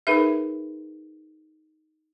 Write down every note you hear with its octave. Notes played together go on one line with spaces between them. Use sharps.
D#4 G#4 A#4 B4 E5